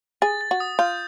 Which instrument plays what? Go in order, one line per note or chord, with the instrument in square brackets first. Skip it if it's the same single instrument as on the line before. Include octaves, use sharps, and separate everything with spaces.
[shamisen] G#4 [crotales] A6
[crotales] A6
[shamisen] F#4
[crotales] D#6
[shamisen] F4 [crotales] G6